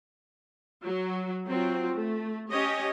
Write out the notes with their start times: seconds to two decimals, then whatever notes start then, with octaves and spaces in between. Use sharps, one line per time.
0.84 F#3 F#4
1.45 F#3 C4 F4 F#4
1.93 A3
2.49 C#4 G4 C#5 D#5